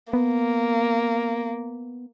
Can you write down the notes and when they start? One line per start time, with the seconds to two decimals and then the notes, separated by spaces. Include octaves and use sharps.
0.13 A#3 B3